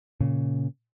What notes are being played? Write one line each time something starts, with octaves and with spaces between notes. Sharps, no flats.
A#2 C#3